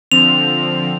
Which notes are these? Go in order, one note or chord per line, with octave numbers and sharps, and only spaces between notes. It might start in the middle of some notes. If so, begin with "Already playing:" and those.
D3 F3 C4 F7